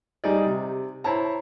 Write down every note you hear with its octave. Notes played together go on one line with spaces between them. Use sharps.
G3 D#4 G#4 D5
C3
E4 C5 C#5 A5 A#5